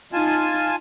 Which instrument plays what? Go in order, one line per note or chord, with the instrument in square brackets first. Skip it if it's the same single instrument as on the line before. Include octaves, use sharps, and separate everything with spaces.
[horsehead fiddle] D#4 [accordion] F4 G#5 A5